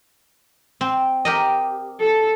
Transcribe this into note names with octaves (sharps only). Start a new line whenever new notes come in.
C4
G4 A#4 D#5
A4